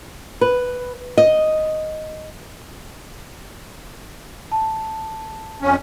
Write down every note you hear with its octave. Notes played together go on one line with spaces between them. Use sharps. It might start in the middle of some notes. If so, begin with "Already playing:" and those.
B4
D#5
A5
F2 C#4